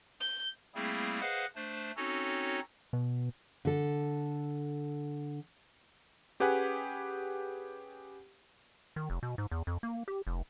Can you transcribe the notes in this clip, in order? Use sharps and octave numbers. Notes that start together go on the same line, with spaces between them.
G6
G3 A3 A#3 C4 E4 G#4
G#4 B4 C5 D#5 F5 F#5
A3 D4 C5
C4 C#4 D#4 F#4 A4 C#5
B2
D3 A4
C#4 G4 G#4 B4 F#5 G#5
D#3
F1
B2
G#2
E2
F2
A#3
G4
F1